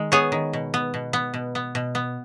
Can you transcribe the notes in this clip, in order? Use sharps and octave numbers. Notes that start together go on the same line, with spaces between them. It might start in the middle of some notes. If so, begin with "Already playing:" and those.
Already playing: D#3 G#3
B3 G#4 C#5
D#3
B2
B3
B2
B3
B2
B3
B2
B3